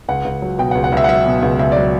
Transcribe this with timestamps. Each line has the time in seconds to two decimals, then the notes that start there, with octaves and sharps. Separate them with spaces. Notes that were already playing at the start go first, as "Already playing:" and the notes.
0.08 C#2 F#5
0.25 C#2
0.42 F#3
0.59 B2 G5
0.71 F#5
0.75 C#2
0.84 F#5
0.92 C#2 E5
1.04 F#5
1.09 F#3 E5
1.26 B2
1.42 C#2
1.59 C#2 E5
1.72 D5
1.76 F#3